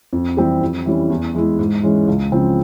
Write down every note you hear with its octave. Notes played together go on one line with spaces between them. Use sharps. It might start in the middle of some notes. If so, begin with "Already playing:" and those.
F2
E3 G3 C4 G4
F2
E3 G3 C#4
E2
E3 G#3 E4
G#2
E3 G#3 C#4
C#2
C#3 F3 C4